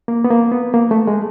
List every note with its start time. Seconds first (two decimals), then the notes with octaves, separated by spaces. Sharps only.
0.08 A#3
0.24 B3
0.30 A#3
0.52 B3
0.74 A#3
0.91 A3
1.07 G#3